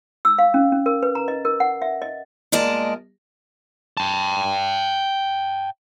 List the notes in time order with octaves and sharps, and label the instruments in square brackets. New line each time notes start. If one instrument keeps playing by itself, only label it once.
[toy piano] E6
F5
C#4
C#4
A#4
B4
A#5
D#5
A#4
F#5
E5
D#5
[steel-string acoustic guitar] A#2 G#3 A#4 D5 D#5 A5
[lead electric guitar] G5 A5